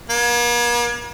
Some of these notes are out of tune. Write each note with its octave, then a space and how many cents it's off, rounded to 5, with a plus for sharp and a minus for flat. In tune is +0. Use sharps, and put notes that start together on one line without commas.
A#3 +45